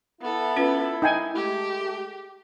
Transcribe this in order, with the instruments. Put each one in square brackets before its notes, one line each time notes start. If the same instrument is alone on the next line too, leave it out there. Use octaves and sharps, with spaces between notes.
[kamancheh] B3 A4 [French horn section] E4
[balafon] C#4 F4 B4
[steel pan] D#4 G5 G#5
[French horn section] G#3 A3 [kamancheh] G4